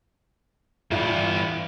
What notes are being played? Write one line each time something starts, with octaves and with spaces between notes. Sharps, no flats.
G2 E3 B3 E4 F4 D5 E5 F5